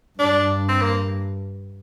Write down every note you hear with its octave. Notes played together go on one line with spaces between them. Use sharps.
G2 D4
C4
A#3